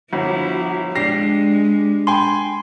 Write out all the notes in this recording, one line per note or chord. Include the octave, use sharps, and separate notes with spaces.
G1 F3 E4 F#4
G#3 D4 G4 A#6 C7
G5 G#5 B5 C6